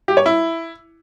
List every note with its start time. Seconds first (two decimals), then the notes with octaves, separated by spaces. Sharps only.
0.08 G4
0.17 C#5
0.26 E4